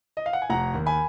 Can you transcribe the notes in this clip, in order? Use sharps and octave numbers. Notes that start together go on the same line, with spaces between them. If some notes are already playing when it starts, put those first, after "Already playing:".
D#5
F5
F#5
G#5
F1 F#5 A#5
D#2
G#5 B5